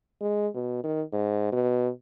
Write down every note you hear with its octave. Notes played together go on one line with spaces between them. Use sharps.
G#3
B2
D#3
G#2
B2